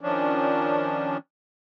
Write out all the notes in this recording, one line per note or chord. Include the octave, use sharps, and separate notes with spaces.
D#3 F3 C#4 D4